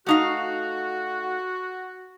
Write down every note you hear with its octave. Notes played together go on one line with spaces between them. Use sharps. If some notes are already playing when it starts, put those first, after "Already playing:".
A3 D#4 F#4 F5